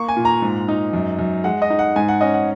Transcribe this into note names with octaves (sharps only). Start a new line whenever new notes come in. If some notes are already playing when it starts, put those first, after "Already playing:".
Already playing: A#3 C#6
G#5
A#2
A#5
G#2
D#4
F#2
F#2
G#3 F#5
D#5
D#4
F#5
G#2 G#5
F#5
C#4 D#5
F#5